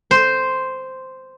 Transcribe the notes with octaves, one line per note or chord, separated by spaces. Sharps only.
C5